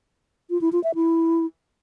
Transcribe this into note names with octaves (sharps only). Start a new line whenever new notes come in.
F4
E4
F4
E5
E4